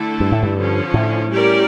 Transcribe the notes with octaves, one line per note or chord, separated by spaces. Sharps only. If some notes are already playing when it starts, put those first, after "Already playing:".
Already playing: D3 A3 E4 A4
G2
A2
G2
D3 F3 C#4
A2
G3 C#4 G4 A#4 D5